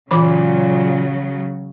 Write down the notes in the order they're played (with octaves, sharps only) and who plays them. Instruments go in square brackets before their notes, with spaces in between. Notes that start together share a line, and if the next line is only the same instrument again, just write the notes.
[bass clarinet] A#2 [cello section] C#3 F#3 [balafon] E3 B5 D6